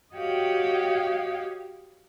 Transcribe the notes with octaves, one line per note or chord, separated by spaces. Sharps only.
F#4 G4 C#5 D#5 F5 G5